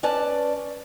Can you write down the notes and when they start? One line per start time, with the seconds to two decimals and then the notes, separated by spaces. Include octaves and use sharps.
0.03 C#4 B4 D5 A5